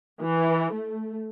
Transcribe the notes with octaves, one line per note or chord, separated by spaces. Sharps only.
E3
A3